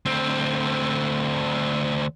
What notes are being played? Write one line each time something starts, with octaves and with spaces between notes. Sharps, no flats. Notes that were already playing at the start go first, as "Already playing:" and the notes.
D2 C4